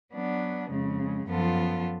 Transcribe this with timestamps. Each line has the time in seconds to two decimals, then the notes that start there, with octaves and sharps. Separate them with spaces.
0.12 F#3 B3 D4
0.70 F2 C#3 G#3
1.25 F#2 F3 B3 F4 A4